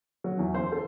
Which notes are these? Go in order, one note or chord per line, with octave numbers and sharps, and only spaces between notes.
F#3
E2
C5
A4